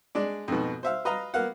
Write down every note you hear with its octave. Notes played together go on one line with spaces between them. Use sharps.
G#3 D4 D5
F2 G#2 B2
C5 E5 F5
B4 D#5 F5 A#5
A#3 B3 F5 F#5